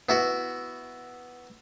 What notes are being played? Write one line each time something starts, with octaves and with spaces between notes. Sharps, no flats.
B3 E4 F#4